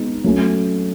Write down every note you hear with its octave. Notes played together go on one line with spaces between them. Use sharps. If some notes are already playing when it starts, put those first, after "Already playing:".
Already playing: G#3 B3 D#4
F#3 A3 C#4